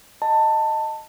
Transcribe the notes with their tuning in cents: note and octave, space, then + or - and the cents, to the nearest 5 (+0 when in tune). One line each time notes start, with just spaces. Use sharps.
D#5 +0 A5 +20